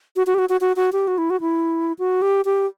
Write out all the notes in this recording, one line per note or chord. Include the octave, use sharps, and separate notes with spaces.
F#4
F#4
G4
F#4
F#4
F#4
F#4
G4
F#4
E4
F#4
E4
F#4
G4
G4